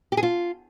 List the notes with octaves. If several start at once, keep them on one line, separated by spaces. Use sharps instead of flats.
G4
G#4
F4